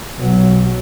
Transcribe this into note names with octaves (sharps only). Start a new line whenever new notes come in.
B1 F#3